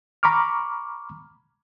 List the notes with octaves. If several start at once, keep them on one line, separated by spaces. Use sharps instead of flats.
A#5 B5 C#6 D6 F6